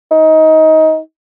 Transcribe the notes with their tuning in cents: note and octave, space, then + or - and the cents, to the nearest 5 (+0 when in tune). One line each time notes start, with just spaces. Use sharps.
D#4 +20